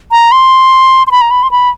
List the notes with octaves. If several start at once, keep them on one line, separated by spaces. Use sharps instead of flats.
A#5
C6
C6
B5
A#5
B5
C6
B5